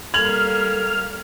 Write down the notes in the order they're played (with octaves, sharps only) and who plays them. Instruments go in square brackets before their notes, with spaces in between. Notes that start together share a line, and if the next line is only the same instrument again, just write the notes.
[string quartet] G3 A#3 [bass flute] A4 [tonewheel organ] F6 [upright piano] G#6 F#7